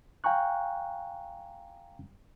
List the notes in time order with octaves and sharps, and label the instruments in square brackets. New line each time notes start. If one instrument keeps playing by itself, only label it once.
[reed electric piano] F5 G5 G#5 A#5 C#6 F#6